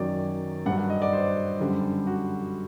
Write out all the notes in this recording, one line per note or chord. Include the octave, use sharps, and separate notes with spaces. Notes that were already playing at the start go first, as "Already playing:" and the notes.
Already playing: F#2 D#3 F#3 D5
G2 F#3 F#5
F#5
D#5
D5
C5
F#2 D3 G3
F#4